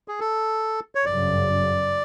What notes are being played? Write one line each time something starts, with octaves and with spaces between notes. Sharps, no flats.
G#4
A4
C#5
G1 F#2 C#3 F#3 D5